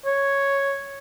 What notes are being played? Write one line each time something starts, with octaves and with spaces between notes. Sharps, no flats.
C#5